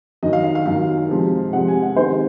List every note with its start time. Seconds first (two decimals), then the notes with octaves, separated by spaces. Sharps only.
0.23 F#2 D#3 F#3 D#5
0.33 F5
0.44 F5
0.55 F5
0.66 F#2 D#3 F#3 F5
1.09 C3 F3 G#3
1.53 C3 F3 G#3 F#5
1.68 G#5
1.83 F#5
1.96 C3 D#3 G#3 C5